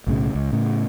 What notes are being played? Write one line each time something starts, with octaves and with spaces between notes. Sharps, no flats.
B1 A2 C#3
C#2
A2 C#3